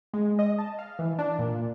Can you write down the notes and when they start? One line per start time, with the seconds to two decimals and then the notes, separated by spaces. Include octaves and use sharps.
0.13 G#3
0.39 D#5
0.58 A5
0.79 F5
0.99 E3
1.19 D4
1.39 A#2